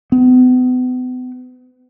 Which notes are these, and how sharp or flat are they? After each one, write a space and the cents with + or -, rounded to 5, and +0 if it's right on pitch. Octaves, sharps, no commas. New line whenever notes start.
B3 +40